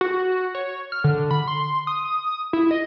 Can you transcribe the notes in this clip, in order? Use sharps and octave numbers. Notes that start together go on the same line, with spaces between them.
F#4
C#5
F6
D3
B5
C6
D#6
E4
D#5